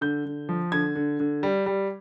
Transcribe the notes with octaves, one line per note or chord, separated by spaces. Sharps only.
D3 G6
D3
F3
D3 G#6
D3
D3
G3
G3